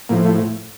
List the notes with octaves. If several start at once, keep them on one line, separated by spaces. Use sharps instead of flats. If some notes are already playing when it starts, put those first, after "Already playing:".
A2 F3 A#3
A3